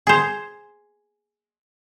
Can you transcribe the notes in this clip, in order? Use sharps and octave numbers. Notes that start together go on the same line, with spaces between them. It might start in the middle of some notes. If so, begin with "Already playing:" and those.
G#4 C5